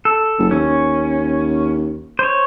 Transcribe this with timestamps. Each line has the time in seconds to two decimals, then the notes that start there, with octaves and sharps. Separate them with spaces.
0.05 A4
0.39 F#1
0.51 D#2 C#4
2.19 C5 C#5